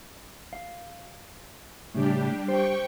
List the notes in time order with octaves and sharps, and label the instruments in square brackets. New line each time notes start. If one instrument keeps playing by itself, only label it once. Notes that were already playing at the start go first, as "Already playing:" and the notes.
[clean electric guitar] F5
[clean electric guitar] A2 C#3 [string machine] G3 D4 G4
[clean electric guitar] G4 C5 [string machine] G5 C#6